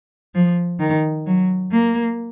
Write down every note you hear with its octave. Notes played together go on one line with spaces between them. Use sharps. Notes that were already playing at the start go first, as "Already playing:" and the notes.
F3
D#3
F#3
A#3